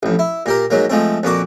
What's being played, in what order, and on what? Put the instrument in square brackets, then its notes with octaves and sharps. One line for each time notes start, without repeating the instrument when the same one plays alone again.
[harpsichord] A1 F2
E4
A#2 G4 A#4
G#2 F#3 A#3
F3 G#3 A3 C4
F2 A#2 F#4 D6